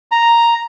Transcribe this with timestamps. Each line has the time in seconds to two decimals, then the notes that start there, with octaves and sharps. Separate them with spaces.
0.11 A#5